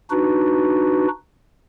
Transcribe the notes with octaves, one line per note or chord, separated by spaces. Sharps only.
D4 D#4 F#4 B4